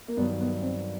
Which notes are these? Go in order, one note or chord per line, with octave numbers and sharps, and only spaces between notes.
A#3
G2 D#3 F#3 B3
B3
C4